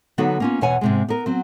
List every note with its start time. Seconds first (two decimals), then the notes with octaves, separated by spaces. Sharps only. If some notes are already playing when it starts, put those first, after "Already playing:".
0.18 D3 F#3 B3 D#4 F#4 B4
0.40 A#3 C#4 F4
0.61 E2 B2 E3 C#5 F#5 G#5
0.81 G#2 C3 G#3
1.08 B3 A#4
1.26 F#3 C4